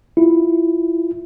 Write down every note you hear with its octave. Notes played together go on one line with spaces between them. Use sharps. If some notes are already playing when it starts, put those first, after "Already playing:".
E4 F4